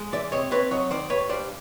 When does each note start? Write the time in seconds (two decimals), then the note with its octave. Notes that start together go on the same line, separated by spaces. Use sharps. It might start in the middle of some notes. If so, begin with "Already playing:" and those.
Already playing: G#3
0.12 E3 D5 E5
0.32 C3 C#5 D#5
0.51 C4 B4 C#5
0.71 F#3 C#5 D#5
0.90 D#3 C5 D5
1.09 G2 B4 C#5
1.29 G2 C5 D5